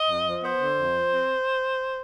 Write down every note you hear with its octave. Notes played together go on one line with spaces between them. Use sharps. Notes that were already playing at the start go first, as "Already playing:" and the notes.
Already playing: D#5
F2
F3
B3 C5
D3
F2
F3
C4